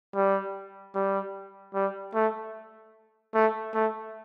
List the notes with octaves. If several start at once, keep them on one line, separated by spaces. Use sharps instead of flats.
G3
G3
G3
A3
A3
A3